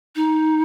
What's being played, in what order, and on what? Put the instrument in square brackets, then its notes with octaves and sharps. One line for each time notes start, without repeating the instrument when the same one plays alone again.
[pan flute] D#4